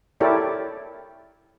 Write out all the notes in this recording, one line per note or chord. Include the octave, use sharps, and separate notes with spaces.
E4 G4 A4 A#4 C#5 D5